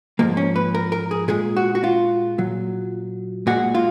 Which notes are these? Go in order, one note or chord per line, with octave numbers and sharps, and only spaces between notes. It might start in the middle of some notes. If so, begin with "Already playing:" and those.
G#2 F3 G#3 A#3
C#4
B4
A#4
A#4
G#4
A#2 G#3 G#4
F#4
F#4
F4
A#2 F#3
A#2 G#3 F#4
F4